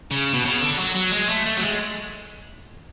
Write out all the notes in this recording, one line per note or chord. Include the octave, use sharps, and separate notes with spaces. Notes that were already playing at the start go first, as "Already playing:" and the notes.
C#3
B2
C#3
D3
F#3
F#3
G#3
A3
A3
F#3
G#3